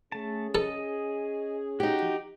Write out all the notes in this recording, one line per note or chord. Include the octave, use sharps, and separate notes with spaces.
A3 C#4 G#4 A5
A4 D#5
D#4 F#4 G4